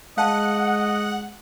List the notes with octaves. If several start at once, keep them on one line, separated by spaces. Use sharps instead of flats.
G#3 D#5 F5 F#5 A5